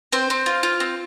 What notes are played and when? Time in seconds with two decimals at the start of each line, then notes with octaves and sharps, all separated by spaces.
0.12 C4 C5
0.30 C4
0.46 F4
0.63 F4
0.80 C4